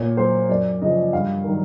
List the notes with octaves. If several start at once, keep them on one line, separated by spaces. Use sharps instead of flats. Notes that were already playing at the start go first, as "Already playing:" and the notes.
Already playing: A#2 C#5
F#3 C5
F#2 D5
C#3 F3 D#5
G2 F5
D#3 F#3